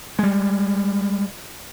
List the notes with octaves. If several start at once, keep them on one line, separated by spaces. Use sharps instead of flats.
G3 G#3